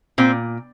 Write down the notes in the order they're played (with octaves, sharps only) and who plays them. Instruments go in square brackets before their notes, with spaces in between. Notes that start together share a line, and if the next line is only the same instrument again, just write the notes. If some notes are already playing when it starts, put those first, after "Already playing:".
[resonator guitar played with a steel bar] A#2 C4